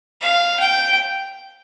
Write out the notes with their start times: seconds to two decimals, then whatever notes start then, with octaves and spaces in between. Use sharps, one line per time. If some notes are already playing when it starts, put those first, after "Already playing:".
0.21 F5
0.60 G5